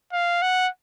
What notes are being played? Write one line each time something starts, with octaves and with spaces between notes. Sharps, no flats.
F5
F#5